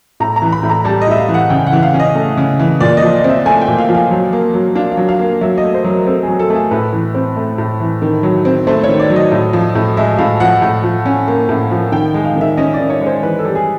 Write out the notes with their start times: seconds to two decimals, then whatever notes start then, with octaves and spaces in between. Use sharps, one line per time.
0.20 A2 A#5
0.36 A#5
0.42 E3
0.52 B5
0.63 A2
0.70 A#5
0.85 G3 A5
1.02 D#5
1.07 A2 E5
1.18 F5
1.29 E3
1.34 F#5
1.50 C#3 G5
1.67 F#5
1.72 E3
1.83 F5
1.94 C#4
2.00 D#5
2.15 A3
2.37 C#3
2.60 E3
2.80 A#2 D5
2.97 D#5
3.02 F3
3.18 D#5
3.24 C4 E5
3.46 A3 G#5
3.61 G5
3.68 A#2
3.78 F5
3.89 F3
3.94 F5
4.11 F#3
4.33 A#3
4.54 F#3
4.75 D4 F5
4.92 F5
4.97 F#3
5.09 F5
5.19 A#3
5.41 F#3 E5
5.58 D#5
5.63 A3
5.74 C5
5.84 F#3
5.90 A#4
6.06 C4 A4
6.23 G#4
6.28 F#3
6.39 A4
6.50 A3
6.55 G#4
6.71 A2 B4
6.93 E3
7.15 C4
7.36 A3
7.58 A2
7.80 E3
8.02 D#3
8.23 F#3
8.45 C4
8.67 A3 C5
8.83 C#5
8.89 D#3
8.99 D5
9.10 F#3
9.16 D#5
9.32 A2
9.53 F3
9.75 A2
9.97 G#3 E5
10.18 A2 F5
10.40 F3 F#5
10.62 A2
10.83 F3
11.05 C#4
11.28 A#3
11.49 A2
11.71 F3
11.92 D#3 G5
12.14 G#3
12.25 F5
12.36 D#3 E5
12.57 C#4 D#5
12.74 D5
12.79 D#3
12.90 C#5
13.01 G#3
13.06 C5
13.23 E3 B4
13.39 A4
13.45 G3
13.55 G#4